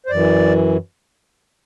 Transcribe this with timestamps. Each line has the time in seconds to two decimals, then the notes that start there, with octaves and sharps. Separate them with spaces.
0.06 C5
0.10 F#2 E3 D5